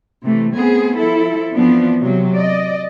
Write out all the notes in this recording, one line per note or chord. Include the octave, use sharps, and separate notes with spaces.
C3 E3 A3
A3 B3 C4 G#4
F3 E4 A4
E3 F3 B3 C4 D4
C3 F#3
D5 D#5